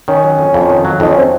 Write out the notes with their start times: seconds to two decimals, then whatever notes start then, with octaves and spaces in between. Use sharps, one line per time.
0.08 D#3 C#4
0.24 F#3
0.39 F2
0.54 F2
0.70 D#3
0.85 F#3
1.00 F2 D#4
1.09 C#4
1.18 C4